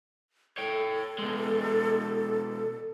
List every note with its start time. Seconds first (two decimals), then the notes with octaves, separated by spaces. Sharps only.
0.58 A4 C#5 G5
1.18 B2 G#3